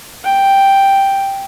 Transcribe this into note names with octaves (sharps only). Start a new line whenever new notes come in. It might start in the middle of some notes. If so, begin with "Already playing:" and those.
G5